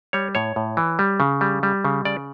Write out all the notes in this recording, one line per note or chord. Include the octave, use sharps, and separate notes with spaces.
G3 C#5
A2 C#5
A2
E3
G3
C#3
G3
G3
C#3
C#3 D5